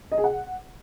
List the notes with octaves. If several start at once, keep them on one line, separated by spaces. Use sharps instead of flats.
D#5
G#4
F#5